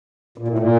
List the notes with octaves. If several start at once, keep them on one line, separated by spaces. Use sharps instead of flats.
A#2
A2
A#2